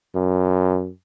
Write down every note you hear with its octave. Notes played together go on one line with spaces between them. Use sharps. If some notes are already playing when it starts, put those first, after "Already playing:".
F#2